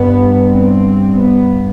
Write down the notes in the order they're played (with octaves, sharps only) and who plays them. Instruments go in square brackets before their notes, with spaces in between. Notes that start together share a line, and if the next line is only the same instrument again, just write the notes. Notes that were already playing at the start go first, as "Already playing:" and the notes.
Already playing: [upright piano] G2 [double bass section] B3
[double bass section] C4
B3